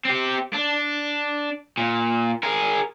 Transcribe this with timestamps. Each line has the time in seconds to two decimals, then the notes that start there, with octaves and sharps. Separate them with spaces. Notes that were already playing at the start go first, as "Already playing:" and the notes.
0.05 C4 G4
0.54 D4
1.77 A#2
2.43 G#4 A#4